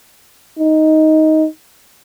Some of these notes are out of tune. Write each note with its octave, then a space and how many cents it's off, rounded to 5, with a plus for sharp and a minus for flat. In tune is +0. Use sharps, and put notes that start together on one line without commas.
D#4 +10